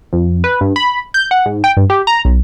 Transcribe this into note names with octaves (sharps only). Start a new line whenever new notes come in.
F2
B4
G2
B5
G6
F#5
G#2
G5
G2
G4
A#5
B1